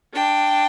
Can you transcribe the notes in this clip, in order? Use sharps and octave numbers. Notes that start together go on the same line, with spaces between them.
D4 G5